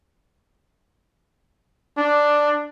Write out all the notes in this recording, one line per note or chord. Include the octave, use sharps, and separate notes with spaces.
D4